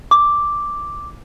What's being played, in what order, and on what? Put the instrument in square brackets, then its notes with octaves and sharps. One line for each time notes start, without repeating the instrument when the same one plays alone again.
[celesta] D6